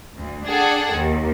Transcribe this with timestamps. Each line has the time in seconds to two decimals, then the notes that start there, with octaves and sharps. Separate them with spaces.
0.17 D2
0.47 D4 G#4 A4 F#5 G5
0.94 D#2